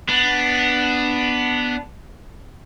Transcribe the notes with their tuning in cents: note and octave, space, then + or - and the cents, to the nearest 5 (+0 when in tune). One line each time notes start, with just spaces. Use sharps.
B3 +0 D4 +0